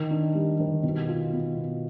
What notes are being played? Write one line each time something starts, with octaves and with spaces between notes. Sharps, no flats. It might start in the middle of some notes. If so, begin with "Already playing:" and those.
Already playing: D#3
D4
G3
D#3
B2
F4
B3
B2